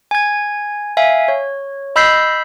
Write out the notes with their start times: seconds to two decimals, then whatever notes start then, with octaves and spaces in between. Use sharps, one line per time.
0.11 G#5 G#6
0.97 E5 F5 G#5
1.28 C#5
1.96 D#5 B5 E6 G6 B6 C7